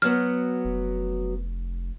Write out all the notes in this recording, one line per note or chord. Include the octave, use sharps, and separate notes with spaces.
F#3 B3 F6
F1